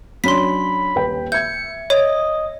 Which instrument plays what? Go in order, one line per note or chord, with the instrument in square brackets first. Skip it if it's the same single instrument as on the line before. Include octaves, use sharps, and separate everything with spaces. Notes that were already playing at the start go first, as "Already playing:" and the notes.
[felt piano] F#3 C#4 D4 [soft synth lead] B5 [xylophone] C6 B6
[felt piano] D#1 B4 G5
[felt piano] E5 G#6 [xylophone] G6 [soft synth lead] C#7
[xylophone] C#5 [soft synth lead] D#5